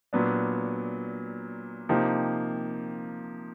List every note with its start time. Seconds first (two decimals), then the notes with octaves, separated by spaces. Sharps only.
0.13 A#2 F#3 B3 D4
1.89 C3 F3 A#3 D#4 G4